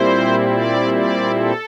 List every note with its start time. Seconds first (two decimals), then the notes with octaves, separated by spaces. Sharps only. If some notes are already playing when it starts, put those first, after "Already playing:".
Already playing: A#2 G3 C4 E4 C5
0.52 D5
0.94 D5
1.36 A4